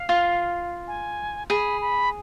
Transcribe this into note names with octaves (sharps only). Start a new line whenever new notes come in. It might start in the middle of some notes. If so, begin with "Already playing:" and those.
Already playing: F5
F4
G#5
G#4 B5
B5